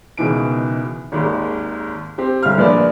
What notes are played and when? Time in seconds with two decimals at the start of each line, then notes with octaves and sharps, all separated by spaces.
0.18 C#2 B2 D#3 E3 D7
1.12 G#1 D#2 G#2
2.18 C4 G4
2.43 G1 C2 E5 F5 F6
2.58 A#1 A#2 B4 D5